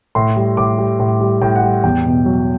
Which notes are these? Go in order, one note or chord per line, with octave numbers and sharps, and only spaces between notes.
A2 C6
G3
A2 D6
G3
A2
G3
A2 G5
F#5
G3
E2 G5
B2
F#3